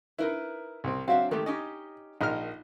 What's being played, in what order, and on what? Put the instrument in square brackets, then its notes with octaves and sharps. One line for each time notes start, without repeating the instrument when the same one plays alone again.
[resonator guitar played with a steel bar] D#4 A#4 B4 [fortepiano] E4
[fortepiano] C2 C4
[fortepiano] F#3 C4 F#4 [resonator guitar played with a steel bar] D4 E5 F5
[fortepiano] D#3 A3 [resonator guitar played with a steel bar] G#3 G4
[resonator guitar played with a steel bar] C#4 D#4 G4 [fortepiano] D#5
[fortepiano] A#1 D#4 F6 [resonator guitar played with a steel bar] A#4